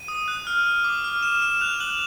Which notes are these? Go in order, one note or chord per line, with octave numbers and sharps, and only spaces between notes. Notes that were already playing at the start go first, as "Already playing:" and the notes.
Already playing: D#7
D#6
F#6
F6
F6
D6
F6
F6 E7
F6 E7
F#6 F7
F#6 F#7